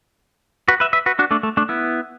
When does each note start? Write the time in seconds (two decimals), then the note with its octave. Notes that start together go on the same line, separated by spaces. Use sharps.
0.68 F#4 B4
0.80 B4 E5
0.93 B4 E5
1.06 F#4 B4
1.19 D4 F#4
1.31 A3 D4
1.43 A3
1.57 A3 D4
1.69 B3 E4